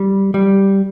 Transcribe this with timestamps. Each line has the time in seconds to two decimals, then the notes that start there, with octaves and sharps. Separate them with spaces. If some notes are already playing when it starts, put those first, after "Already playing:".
Already playing: G3
0.34 G3